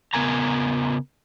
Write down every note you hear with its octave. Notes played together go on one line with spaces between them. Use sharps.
C#3 B3 A#4 G#5 A#5